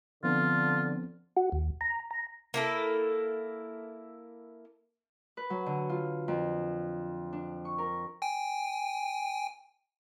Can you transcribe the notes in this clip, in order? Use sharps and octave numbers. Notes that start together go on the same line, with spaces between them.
D3 F3 B3 C4 F4
F#4
D#2
A#5
A#5
A#3 E4 A4
B4
F#3
D3
F4
F2
D4
C#6
A#4
G5 G#5